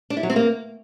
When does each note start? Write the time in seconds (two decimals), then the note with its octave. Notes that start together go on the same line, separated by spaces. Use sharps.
0.10 D4
0.17 E4
0.23 F#3
0.30 C4
0.36 A#3